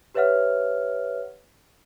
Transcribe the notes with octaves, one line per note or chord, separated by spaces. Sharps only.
G4 B4 C#5 E5 F#5 F6